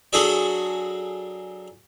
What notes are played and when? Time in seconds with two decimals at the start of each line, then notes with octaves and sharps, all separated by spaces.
0.13 F#3 D4 F#4 G#4 A4 D5